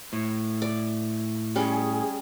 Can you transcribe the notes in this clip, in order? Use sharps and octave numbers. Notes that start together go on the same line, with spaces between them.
A2
D5
G3 C#4 G#4